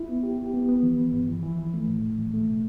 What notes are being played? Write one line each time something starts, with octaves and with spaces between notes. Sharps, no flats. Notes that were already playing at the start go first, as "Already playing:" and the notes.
Already playing: E4
B3
G4
G4
B3
B3
E3
E3
G2
E3
E3
E3
A3
A2
A2
E3
A3
B2